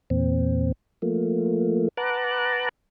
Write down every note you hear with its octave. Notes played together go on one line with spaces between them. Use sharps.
E2 A#2 C4
F3 A3 A#3
B4 F#5 A5 A#5 D6 F#6